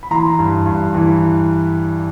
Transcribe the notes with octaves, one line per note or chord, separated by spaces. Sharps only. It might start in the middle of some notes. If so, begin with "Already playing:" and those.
B5
E3 A#5 C6
G2
G2
E3